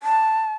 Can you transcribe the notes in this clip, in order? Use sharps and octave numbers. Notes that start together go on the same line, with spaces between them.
A5